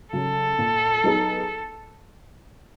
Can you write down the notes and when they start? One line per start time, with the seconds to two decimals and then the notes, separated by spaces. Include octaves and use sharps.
0.13 C#3 F#3 A4
0.58 A#2
1.04 F#3 B3 D#4 G#4